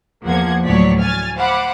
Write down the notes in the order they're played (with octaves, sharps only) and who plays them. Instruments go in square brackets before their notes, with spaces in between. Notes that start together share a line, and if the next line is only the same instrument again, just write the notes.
[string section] E2 F3 A#3 F#5 G#6
D2 A2 F#3 C#5 D5 B6
G#5 F6 A6
C5 F5 F#5 B5 D6